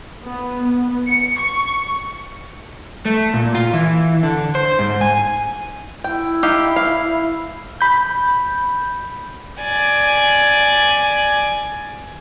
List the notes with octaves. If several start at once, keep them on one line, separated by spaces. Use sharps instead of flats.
B3
B3
C#7
C#6
A3
A#2
F4
E3
D3
C5
G#2
G#5
E4 G5
D#4 G4 F5
F5
B5 G6
D5 G#5